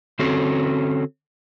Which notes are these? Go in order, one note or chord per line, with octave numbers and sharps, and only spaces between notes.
D3 C4 C#4 F#4 A4